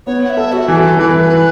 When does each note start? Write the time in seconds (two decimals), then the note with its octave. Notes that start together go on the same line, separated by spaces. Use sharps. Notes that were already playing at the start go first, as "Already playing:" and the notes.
0.07 B3 C#5
0.24 F#5
0.30 E5
0.37 A4
0.53 F#4
0.68 E3
0.76 A4
0.99 E3 B4
1.09 A4
1.20 B4